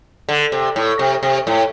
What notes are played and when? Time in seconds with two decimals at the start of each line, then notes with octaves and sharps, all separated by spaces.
0.29 D3
0.52 C3
0.76 A2
0.99 C3
1.23 C3
1.47 A2